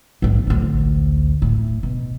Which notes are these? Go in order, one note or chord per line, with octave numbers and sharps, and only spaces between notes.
A#1 G#2
A1 D2
A2
B2